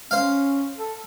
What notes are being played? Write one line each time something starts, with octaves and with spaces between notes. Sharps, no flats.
C#4 C5 F5
A4